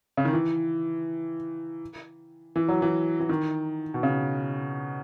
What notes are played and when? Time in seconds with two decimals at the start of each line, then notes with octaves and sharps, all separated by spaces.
0.17 C#3
0.25 D#3
0.33 E3
2.56 E3
2.68 F#3
2.82 E3
3.20 E3
3.29 D#3
3.94 B2
4.03 C#3